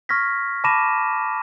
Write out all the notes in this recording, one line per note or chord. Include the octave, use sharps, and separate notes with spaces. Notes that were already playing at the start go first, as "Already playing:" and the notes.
C#6 F6 G#6 A#6 B6
A5 B5 D6 A#6 D#7 E7